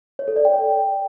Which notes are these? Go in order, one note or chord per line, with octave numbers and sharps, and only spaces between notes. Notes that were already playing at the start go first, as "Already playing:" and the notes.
C#5
A4
D5
G5